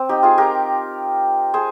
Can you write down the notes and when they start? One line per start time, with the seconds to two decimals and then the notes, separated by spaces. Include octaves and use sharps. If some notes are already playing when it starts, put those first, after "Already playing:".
Already playing: C4
0.09 D#4 G4
0.23 F4 G#4
0.38 G4 A#4
1.54 G#4 C5